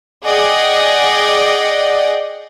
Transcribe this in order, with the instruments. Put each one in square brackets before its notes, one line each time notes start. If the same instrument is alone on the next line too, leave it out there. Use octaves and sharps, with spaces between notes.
[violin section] G#4 D5 D#5 F#5 G5